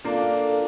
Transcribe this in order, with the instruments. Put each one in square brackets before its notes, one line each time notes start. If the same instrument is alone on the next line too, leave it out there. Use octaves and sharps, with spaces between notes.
[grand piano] A#3 D4 [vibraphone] F4 A4 D5 F5